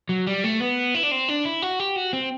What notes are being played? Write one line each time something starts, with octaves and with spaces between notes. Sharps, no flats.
F#3
G3
A3
B3
E4
D4
C4
D4
E4
F#4
G4
F#4
C4